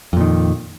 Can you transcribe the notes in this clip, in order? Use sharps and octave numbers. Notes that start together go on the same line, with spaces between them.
F2 A#2 D#3